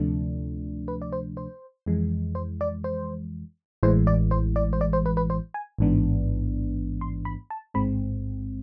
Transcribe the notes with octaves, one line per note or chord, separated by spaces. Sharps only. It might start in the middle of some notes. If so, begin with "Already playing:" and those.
Already playing: D2 C3 F3 A3 D4
B4
D5
C5
C5
F2 E3 G#3
C5
D5
C5
A1 A2 E3 G#3 C5
D5
C5
D5
C5
D5
C5
B4
B4
C5
G#5
A1 G#2 E3 B3 D4
C6
B5
A5
A1 G#2 G#3 C4 B5